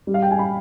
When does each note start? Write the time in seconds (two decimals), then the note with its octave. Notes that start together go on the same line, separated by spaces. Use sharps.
0.07 G3
0.14 F5
0.22 G5
0.31 G#5
0.39 B5